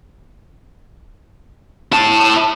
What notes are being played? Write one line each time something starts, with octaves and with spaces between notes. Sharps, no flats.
E4 A5